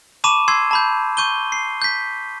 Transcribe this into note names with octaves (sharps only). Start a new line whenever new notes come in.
A5 B5 C#6 D6 D#7 E7
C6 E6 G#6 C7
A5 B5 G6
C#6 G6 D#7 G7
C7
G6 B6